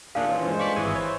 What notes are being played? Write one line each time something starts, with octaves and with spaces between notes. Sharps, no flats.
D#2 A#2 A#3 D4 G#4 F5
E3 C#4 F4
G2 G#3 C5
F2 C3 D5 C#6 B6 C#7
G#1 E3 G#4 G#5
C5 C#5